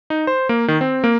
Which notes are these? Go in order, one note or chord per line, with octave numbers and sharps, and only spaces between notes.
D#4
C5
A#3
D#3
C4
A#3